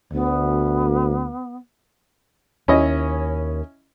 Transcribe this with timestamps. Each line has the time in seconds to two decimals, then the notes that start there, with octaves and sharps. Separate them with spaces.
0.12 D2 B3
2.68 D#2 C#4 E4 D#5